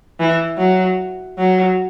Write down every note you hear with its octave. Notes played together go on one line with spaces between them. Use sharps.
E3
F#3
F#3